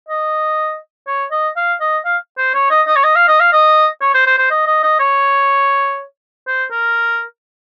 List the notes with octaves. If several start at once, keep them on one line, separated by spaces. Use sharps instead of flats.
D#5
C#5
D#5
F5
D#5
F5
C5
C#5
D#5
D#5
C#5
D#5
F5
D#5
F5
D#5
C#5
C5
C5
C5
D#5
D#5
D#5
C#5
C5
A#4